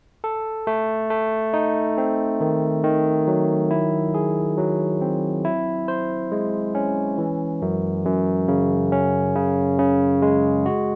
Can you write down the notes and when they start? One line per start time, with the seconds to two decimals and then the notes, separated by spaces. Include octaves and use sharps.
0.24 A4
0.67 A3
1.10 A3
1.54 D#4
1.98 C4
2.41 D#3
2.84 D#3
3.27 F#3
3.71 E4
4.14 G#4
4.57 F#3
5.01 C4
5.45 E4
5.88 C5
6.32 G#3
6.75 C#4
7.18 E3
7.62 F#2
8.05 F#2
8.48 C#3
8.92 C#4
9.35 C#3
9.79 C#3
10.22 G#3
10.66 F#4